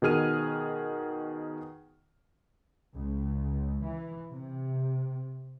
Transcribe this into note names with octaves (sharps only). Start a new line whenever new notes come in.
B2 D#3 G#4 F6 D#7
C#2
E3
C3